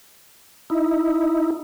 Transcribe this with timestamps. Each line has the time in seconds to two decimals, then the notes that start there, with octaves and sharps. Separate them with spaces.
0.70 D#4 E4